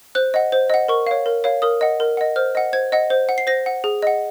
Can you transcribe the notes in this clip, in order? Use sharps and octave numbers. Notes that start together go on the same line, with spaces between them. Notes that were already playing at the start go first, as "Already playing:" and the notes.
C5 F#6
D#5 F#5
C5
D#5 F#5
A#4 C#6
C#5 F5
A#4
C#5 F5
A#4 D#6
D#5 F#5
A#4
D#5 F#5
C5 F6
D#5 F#5
C5 G#6
D#5 F#5
C5
F#5
C7
C5 A#6
F#5
G#4
D#5 F#5